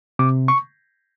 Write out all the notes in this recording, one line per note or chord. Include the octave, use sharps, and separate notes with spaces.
C3 D6
C#6